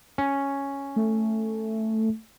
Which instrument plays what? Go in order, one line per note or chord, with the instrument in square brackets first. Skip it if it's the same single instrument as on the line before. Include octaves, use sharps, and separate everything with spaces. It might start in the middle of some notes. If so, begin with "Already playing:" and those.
[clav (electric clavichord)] C#4
[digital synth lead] A3